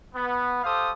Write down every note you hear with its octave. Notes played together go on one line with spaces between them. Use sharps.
B3
G4 A4 C5 F5 D#6